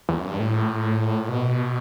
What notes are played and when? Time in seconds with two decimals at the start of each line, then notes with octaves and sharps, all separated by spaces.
0.09 E2
0.18 F#2
0.28 G2
0.39 A2
1.29 B2